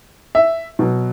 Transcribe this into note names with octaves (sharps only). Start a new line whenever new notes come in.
E5
B2 F#3